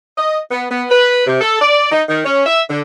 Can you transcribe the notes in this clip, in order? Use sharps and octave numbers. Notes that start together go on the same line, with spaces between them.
D#5
B3
B3
B4
C3
A4
D5
D#4
D#3
C#4
E5
D3